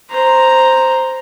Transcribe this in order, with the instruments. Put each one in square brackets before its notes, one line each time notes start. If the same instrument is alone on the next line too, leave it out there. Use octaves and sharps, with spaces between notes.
[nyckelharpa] C5 A#5